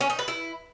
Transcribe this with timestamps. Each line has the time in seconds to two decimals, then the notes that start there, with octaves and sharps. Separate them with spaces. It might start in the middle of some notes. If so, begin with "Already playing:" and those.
0.01 C#4
0.10 D#4
0.19 B4
0.28 E4